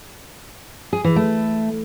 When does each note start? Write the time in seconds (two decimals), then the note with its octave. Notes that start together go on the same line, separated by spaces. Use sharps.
0.93 G#4
1.04 E3
1.16 A3